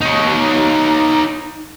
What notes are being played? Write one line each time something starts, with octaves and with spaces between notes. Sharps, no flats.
D#4 C#5